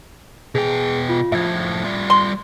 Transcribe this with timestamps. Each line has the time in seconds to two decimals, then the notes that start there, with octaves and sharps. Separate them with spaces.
0.55 B2 G#4 G5
1.09 F4
1.32 A2 F3 E5 G#6
1.84 G3 F4
2.10 C6